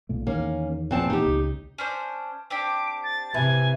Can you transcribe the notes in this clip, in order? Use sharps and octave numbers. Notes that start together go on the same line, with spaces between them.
B1 A#2 A3
E2 D#3 A#3 C#4
E2 A#2 F3 C4 A5
A#2 E3 D#4 G4
C#2
C#4 D4 C5
C4 D4 G4 D6
A6
C3 E3 G#5